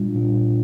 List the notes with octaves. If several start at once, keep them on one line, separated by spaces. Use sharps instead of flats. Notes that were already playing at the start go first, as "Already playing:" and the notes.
Already playing: A#2 G3 D4 F4
A#2 G3 D4 F4